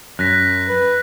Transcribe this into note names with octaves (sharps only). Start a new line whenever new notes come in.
F#2 F#6 A#6 B6
B4